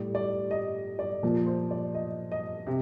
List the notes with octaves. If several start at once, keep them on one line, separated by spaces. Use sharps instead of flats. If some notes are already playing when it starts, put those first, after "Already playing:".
Already playing: A2 G3 D5
D5
D#5
D5
A#2 F3
C5
D5
D#5
D#5
C3